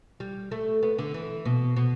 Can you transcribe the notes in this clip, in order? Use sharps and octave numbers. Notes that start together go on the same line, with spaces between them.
G3
A3
B3
D3
E3
B2
B2